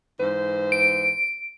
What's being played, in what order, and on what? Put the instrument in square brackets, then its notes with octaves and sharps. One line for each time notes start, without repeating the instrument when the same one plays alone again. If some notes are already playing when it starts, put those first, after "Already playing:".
[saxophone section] G#2 E3 C5
[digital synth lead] D7